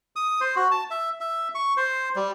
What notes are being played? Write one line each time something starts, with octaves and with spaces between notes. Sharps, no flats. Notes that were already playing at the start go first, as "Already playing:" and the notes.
D#6
C5
F#4
A5
E5
E5
C#6
C5
G3